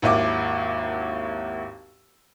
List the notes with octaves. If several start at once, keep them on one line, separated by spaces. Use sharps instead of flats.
G#1 D#2 E4 D6